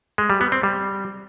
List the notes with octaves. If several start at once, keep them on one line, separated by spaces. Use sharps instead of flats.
G#3
G3
B3
C4
G3